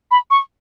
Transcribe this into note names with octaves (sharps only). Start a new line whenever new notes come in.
B5
C#6